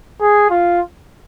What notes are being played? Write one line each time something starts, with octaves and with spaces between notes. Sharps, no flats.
G#4
F4